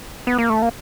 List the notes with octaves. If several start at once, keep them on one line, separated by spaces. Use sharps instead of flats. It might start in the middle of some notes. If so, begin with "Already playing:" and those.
B3
A#3
A3
A#3